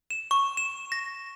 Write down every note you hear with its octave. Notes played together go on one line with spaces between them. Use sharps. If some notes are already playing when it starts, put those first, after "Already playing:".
E7
C#6
E7
A#6